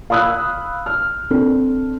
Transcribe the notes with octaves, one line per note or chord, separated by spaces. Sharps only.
F5 B5 D#6 E6 F#6
F6
C4 D4 A4